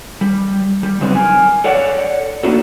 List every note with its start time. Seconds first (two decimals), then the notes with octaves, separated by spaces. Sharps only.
0.21 G3
0.83 G3
1.01 C#3 F#3 G3 B3 C4 D#4
1.15 A#4 G#5
1.64 A4 C#5 D5 F#5
2.43 A3 A#3 D4 D#4 F#4 A4